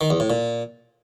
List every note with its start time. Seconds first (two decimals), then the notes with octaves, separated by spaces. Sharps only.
0.01 D#3
0.10 E2
0.20 A2
0.30 A#2